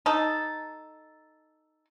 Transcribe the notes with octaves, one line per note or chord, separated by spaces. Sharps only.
D#4 A4